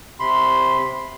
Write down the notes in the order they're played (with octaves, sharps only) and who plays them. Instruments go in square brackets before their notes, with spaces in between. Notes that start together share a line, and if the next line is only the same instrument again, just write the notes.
[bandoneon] C3 B5 C6